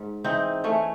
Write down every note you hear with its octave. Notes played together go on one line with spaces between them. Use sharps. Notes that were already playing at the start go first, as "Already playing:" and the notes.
Already playing: G#2
E3 C4 D#4
E3 A3 C#4